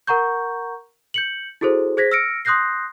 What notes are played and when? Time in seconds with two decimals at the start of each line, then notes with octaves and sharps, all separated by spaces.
0.07 A#4 F#5 A#5 C#6 G6
1.14 G6 C#7 F#7
1.61 E4 F#4 G#4 A4 C5
1.97 G#4 C5 G#6 A#6 B6
2.11 E6 F6 A#6 C#7 D7
2.45 C6 D#6 F#6 G6 A#6 C7